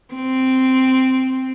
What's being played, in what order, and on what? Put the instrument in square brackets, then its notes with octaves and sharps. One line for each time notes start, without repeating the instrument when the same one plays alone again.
[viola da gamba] C4